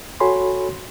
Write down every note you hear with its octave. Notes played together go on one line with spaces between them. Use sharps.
F#4 A4 C#5 G#5 B5 C6